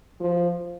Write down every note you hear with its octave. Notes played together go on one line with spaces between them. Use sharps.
F3